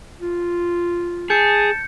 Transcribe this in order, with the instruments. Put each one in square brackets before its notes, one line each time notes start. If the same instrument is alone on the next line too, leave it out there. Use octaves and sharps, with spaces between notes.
[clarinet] F4
[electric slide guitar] G#4 [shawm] A5 [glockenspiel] G6 C#7